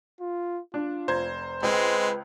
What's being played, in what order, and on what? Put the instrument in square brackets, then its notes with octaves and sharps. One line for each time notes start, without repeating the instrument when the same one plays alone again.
[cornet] F4
[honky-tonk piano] D4 [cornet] F4
[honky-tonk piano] F1 A#5 G#6 [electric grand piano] C5
[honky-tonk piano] C#2 [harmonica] G#3 C4 [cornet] B4